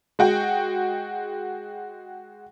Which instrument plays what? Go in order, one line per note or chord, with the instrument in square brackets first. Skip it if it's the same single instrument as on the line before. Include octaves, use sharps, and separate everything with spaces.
[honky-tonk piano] G#3 F#4 G5